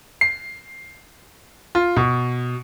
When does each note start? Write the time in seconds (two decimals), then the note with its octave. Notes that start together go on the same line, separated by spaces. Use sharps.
0.21 C7
1.75 F4
1.96 B2